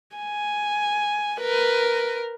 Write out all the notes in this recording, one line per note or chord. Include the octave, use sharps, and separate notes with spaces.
G#5
A#4 B4